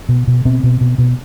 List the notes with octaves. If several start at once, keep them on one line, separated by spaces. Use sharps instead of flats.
B2
B2
B2 C4
B2
B2
B2